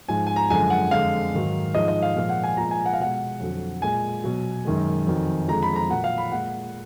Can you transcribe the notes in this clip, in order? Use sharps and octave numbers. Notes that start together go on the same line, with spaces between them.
G#2 F3 G#3 G#5
G#5
A#5
F#2 D3 F3 G#3 G#5
F#5
F2 D3 G#3 F5
G#2 D#3 F#3
G#2 F3 G#3 D#5
D#5
F5
A#2 F3 G#3 F5
F#5
G#5
A#2 F3 G#3 A#5
G#5
F#5
F5
B2 G#3 F#5
F2 D3 F#3
A#2 G#3 G#5
B2 F#3
F#2 D#3 G#3
F2 D#3 F#3
F2 D3 F3 G#3 A#5
B5
A#5
A#2 F#3 F#5
F5
B5
A#2 G#3 F#5